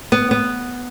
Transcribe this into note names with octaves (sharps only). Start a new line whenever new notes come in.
B3
B3